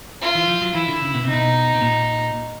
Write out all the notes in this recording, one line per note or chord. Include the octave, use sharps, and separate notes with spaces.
F4
E3
F3
F#3
E3 E4
D3
C#3
B2
C3
D#4
B2
B2
A#2